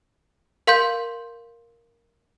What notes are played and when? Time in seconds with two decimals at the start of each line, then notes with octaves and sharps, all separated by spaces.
0.67 A#4 F5 C6 G6